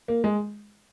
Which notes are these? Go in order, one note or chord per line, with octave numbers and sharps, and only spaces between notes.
A#3
G#3